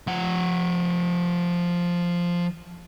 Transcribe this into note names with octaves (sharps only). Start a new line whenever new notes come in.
F3 F#5